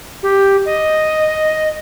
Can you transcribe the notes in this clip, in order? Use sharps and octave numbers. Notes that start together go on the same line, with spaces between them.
G4
D#5